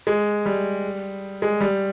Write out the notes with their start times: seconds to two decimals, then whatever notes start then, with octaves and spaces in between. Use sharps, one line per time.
0.07 G#3
0.46 G3
1.42 G#3
1.61 G3